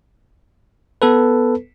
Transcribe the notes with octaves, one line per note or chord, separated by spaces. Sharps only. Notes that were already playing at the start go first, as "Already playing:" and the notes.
B3 A4 B4